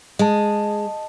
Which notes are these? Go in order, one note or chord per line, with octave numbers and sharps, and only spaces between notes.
G#3 D#5 A5